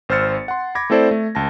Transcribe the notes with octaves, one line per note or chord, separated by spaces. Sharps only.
G#1 C5 E6 F6 A6 C#7
F#5 C6
B5 D6 G#6 A#6
A3 C4 E4 A4 C5 D5
A3
C#2 A5 A#6